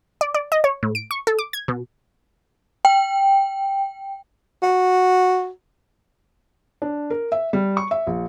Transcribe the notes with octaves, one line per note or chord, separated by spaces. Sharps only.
D5
D5
D#5
C#5
A2
D7
C#6
A4
D6
G#6
B2
G5
F#4
D4
A#4
E5
G3
C#6
E5
A#1